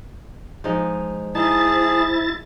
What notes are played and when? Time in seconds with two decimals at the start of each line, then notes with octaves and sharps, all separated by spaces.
0.64 F3 G#3 D#4
1.35 D#4 E4 G#4 C5 A5 A6